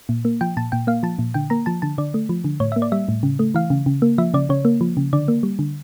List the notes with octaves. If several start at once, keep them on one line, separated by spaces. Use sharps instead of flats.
A#2
A#3
F3 G5
A#2 A5
A#2 G5
A#3 F5
F3 A5
A#2
D3 G5
A#3 A#5
F3 A5
D3 A5
D3 D5
A3
F3
D3
A2 C#5
E5
A#3
D5
G3 E5
A2
C#3
A3
E3 F5
C#3
C#3
A#3
F3 E5
C#3 D5
C#3 C#5
A#3
F3
C#3
D3 D5
A#3
G3
D3